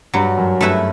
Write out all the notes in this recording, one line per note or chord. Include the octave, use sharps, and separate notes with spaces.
G2 F#3
F#2
G2 A3 E4 B4 E5